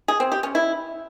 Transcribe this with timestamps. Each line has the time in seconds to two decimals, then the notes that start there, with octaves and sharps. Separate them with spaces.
0.08 G#4
0.20 C4
0.32 G4
0.43 C#4
0.55 E4